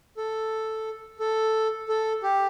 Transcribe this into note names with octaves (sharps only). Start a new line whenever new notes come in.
A4
A4
A4
G4